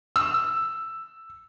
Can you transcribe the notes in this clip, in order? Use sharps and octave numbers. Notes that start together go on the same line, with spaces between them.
E6